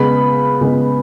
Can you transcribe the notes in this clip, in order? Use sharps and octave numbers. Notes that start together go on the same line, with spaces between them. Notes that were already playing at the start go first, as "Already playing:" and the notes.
Already playing: C#3 G#3 B3 B5
C#3 G#3 B3